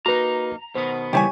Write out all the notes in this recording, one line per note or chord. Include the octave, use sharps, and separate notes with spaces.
A#3 D#4 F#4 B4 A#5
B2 D#3 B3 C5
C#3 E3 G3 G4 C#5 G#5